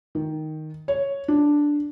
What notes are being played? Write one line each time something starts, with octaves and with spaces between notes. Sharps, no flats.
D#3
C#5
D4